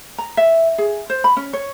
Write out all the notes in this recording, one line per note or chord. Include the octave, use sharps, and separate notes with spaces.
A#5
E5
G#4
C5
B5
C#4
C#5